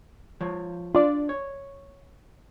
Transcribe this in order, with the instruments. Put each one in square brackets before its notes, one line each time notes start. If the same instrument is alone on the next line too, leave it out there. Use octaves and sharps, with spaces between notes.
[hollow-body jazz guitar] F3 C#5
[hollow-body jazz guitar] D4 [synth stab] F4 D5
[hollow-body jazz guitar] C#5